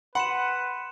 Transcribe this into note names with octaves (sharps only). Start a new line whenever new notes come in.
B4 F#5 B5 C6 C#7 E7